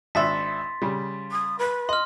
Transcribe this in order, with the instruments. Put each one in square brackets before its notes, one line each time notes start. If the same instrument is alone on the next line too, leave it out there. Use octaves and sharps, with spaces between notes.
[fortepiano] G#1 D4 E5 [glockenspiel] C6 A6 B6
[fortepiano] C#3 G3
[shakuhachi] D#6
B4
[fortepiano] D#5 [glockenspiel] C6 F6